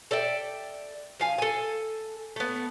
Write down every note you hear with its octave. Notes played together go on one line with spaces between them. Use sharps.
A4 D5 E5 G5
F3 F5 G#5
A4 G#5
A3 B3